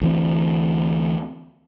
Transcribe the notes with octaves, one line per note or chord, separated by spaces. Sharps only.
D2 E3 C4